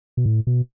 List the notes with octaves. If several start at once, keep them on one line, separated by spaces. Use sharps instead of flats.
B2
A2
B2